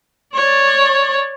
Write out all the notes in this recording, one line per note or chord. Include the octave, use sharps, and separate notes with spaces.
C#5 D5